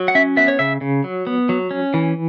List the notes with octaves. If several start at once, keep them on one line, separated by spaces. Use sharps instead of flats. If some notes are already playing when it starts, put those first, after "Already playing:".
Already playing: F#3
F#5
C#4 E5
B3 E5
C#5
C#3 E5
C#3
F#3
B3
F#3
C#4
E3